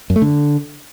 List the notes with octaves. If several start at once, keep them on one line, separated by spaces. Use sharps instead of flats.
F#2
A3
D3